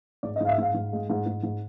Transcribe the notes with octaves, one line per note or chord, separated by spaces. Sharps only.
G#2 D5
D#5
G#2 F5
E5
G#2 F5
G#2
G#3
G#2
G#2
G#2